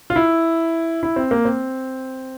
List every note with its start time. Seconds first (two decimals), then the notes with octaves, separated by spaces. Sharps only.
0.10 F4
0.16 E4
1.03 E4
1.16 C4
1.31 A#3
1.45 C4